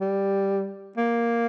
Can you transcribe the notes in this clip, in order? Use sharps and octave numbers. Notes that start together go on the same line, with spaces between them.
G3
A#3